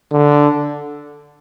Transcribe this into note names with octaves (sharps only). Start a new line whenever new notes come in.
D3